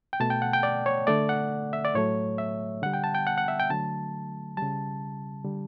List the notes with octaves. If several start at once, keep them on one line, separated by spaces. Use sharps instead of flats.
G5
B2 A3 A5
G5
F#5
G5
D5
C#5
D3 A3 D5
F#5
E5
D5
A2 F#3 A3 C#5
E5
D3 G3 F#5
G5
A5
G5
F#5
F#5
E5
G5
D3 F#3 A3 A5
C#3 G3 A5
D3 G3